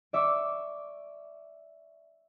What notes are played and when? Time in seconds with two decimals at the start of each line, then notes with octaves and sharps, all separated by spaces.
0.13 D5 E5 C#6 D6 E6